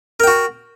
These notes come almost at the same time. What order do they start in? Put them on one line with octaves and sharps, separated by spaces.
A#4 G5 F#4